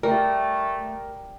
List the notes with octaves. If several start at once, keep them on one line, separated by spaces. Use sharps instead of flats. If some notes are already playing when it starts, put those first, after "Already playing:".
G3 A3 A#4